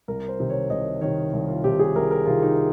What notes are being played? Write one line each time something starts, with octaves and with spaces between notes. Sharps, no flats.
C2 A#4
C5
C3 D#3
C#5
C2 D#5
C3 D#3 C#5
C2
F4
C3 D#3 G4
G#4
C2 A#4
A#4
C3 D#3 F4
D#4